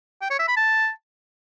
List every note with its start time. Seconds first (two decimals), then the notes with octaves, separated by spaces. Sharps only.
0.22 G5
0.31 C#5
0.39 E5
0.48 B5
0.57 A5